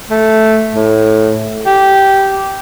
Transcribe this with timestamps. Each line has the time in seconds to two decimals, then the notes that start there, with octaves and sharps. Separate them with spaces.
0.11 A3
0.75 A2
1.66 G4